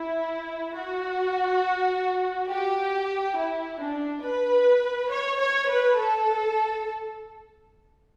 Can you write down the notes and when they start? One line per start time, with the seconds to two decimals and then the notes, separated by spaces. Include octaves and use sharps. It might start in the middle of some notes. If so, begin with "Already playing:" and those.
Already playing: E4
0.75 F#4
2.49 G4
3.37 E4
3.80 D4
4.24 B4
5.11 C#5
5.41 C#5
5.69 B4
5.99 A4